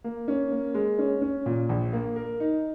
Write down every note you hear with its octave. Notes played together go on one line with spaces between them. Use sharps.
A#3
C#4
A#3
G#3
C#4
C#4
A#2
A#1
A#3
A#4
D#4